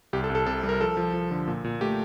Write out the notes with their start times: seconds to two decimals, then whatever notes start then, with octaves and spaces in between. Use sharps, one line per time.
0.13 C2 G4
0.24 A4
0.30 C2
0.35 A4
0.46 C3 A4
0.63 G3
0.69 A#4
0.80 F3 A4
0.97 F3
1.13 F3
1.31 D3
1.47 A#2
1.64 A#2
1.81 A3 G4